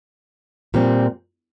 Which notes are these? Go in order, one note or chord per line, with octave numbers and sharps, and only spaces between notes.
A#2 G3 C4